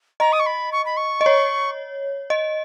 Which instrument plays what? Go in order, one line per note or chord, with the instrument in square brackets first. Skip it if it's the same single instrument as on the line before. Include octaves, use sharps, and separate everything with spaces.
[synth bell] D#5 [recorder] A#5
[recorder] D#6
C#6
B5
C#6
B5
C#6
[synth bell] D#5
C#5
D#5